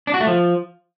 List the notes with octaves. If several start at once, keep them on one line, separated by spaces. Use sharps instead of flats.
D4
F#4
A3
F3